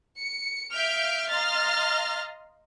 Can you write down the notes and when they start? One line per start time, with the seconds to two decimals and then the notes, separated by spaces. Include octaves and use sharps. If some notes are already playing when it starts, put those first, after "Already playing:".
0.17 C#7
0.72 E5 F5 F6 G6 D7
1.29 D#5 F5 A#5 C6 F6 A6